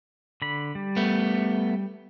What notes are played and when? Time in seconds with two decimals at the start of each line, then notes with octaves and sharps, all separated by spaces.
0.42 D3 B5
0.75 G3
0.96 A3 B3